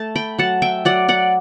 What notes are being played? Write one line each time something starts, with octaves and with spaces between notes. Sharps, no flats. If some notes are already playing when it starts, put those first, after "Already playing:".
Already playing: A3 A5
G5 B5
F#3 F#5 A5
E5 G5
F#3 D5 F#5
D5 F#5